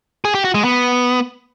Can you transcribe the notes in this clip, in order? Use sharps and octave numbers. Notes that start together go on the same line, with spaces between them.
G#4
G4
F#4
G#3
B3